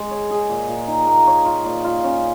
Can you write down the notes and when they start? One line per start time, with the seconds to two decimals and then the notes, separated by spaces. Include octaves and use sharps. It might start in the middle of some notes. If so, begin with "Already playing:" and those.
Already playing: G#3
0.11 C#5
0.31 G#4
0.50 A#2
0.69 A#2
0.88 D#4
1.07 A#3
1.27 C#5
1.45 F4
1.65 A#2
1.84 F4
2.04 C#4